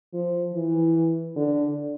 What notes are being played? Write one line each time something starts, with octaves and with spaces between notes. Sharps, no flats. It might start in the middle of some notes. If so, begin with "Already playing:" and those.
F3
E3
D3